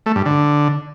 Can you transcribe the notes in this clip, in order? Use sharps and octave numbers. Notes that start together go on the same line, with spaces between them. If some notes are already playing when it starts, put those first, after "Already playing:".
A3
G2
D3